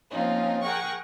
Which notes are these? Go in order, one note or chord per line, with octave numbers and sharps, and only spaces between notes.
F3 A#3 C4 C#4 D#4 F4
G#4 A#4 F#5 G5 C#6